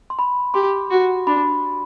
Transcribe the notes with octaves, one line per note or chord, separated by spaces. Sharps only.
C6
B5
G4 C6
F#4
D4 B5